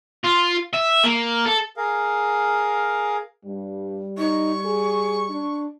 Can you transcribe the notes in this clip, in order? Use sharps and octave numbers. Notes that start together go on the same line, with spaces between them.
F4
E5
A#3
A4
G#4 A#4 F5
G2 G3
D#4 C#6
G#4
D4